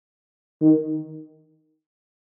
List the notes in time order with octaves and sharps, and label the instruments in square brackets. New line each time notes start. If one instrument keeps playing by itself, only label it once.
[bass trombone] D#3